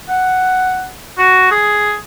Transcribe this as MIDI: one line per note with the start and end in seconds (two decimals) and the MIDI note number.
0.09 0.87 78
1.19 1.50 66
1.51 1.93 68